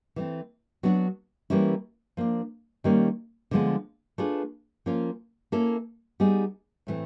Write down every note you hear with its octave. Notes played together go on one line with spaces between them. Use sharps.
E3 A3 C4
F#3 B3 D4 F#4
E3 G3 A#3 C#4 E4
F3 A#3 D4
D#3 G3 A#3 C#4
D3 F3 G#3 B3
A3 D4 F4 G#4 B4
F3 A#3 C#4 F4
A#3 C#4 E4 A4
G3 B3 D#4 G#4
A2 E3 A3 C4